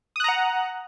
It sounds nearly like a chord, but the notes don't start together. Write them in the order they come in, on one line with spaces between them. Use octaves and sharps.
D#6 F#6 A#5 F#5